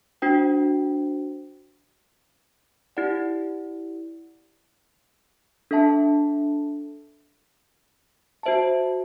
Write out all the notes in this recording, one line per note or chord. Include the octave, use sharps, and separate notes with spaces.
D4 F#4 C5 G5
E4 G4 D5 F#5
D4 A4 E5 A5
F#4 C5 E5 A5